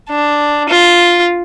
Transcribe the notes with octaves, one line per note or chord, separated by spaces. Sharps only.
D4
F4